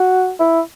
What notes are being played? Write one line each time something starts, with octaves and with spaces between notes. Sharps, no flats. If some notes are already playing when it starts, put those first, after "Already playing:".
Already playing: F#4
E4